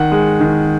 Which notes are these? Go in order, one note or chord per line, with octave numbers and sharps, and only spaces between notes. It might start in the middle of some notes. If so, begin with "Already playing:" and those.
Already playing: D#3 F#5
G#3
D#3